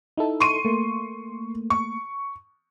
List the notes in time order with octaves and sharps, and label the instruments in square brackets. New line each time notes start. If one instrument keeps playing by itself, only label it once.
[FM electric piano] D#4 E4 A4
[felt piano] C6 C#6 D#7
[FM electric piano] A3 A#3
[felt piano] C#6